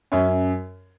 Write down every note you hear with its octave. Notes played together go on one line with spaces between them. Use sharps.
F#2 C#4